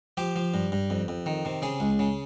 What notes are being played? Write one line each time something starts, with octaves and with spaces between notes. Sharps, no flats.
F3 G4
F3
G2
G2
F2
F2
D#3
C3
C#3 G#4
C#2
C#3